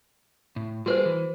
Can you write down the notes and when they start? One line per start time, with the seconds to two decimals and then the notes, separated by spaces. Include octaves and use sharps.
0.56 A2
0.86 G3 A#3 F#4 G#4 B4 C5
1.05 E3